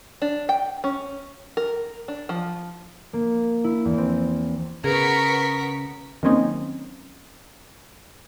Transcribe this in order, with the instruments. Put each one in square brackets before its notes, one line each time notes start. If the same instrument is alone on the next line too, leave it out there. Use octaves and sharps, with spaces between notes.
[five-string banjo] D4
G5
C#4
A#4
D4
F3
[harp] A#3
E4
E2
C4
[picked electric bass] C#3 [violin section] B3 C#6 B6 [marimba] G#4 [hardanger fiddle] A#4
[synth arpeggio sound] D#3 F#3 A#3 C4 C#4 D#4